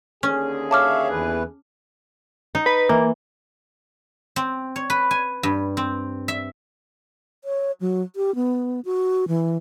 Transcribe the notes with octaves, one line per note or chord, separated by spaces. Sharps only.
D#2 D3 C#4 G#4
C#5 E5 F5 A5 D6 F6
E2 E3 B4
D#4
B4
E3 A#3
C4
C#5
B4
G#5
G2
C4
E5
C#5
F#3
G4
B3
F#4
E3